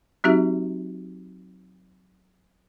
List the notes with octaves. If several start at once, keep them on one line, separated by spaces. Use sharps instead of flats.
F#3 C4 D#4 F#4 G4 E5